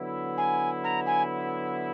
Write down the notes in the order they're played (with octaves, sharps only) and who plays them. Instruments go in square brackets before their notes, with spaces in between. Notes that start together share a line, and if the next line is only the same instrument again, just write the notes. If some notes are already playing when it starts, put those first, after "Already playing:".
Already playing: [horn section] D3 F#3 B3 E4
[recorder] G#5
A#5
G#5